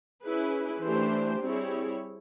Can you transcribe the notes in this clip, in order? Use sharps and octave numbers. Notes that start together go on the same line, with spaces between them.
C#4 E4 G#4 B4
E3 A3 D4 G4 C5
G3 C4 E4 G#4 C#5